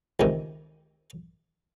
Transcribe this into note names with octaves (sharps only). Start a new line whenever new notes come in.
C#2 C3 D#3